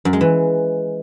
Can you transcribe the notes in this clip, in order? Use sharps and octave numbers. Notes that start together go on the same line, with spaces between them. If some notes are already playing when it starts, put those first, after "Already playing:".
F#2
G#3
E3